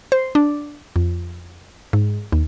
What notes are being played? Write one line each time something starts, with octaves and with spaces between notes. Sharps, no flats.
C5
D4
F2
G#2
D#2